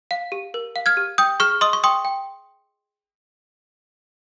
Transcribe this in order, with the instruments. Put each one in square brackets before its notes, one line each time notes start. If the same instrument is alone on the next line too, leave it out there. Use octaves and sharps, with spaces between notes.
[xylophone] F5
G4
A#4
F5
F6 G#6
G4
G5 D#6 G6
G#4 C#6 F6
D#5 C6 D#6
C#6
G5 C6 D#6
G5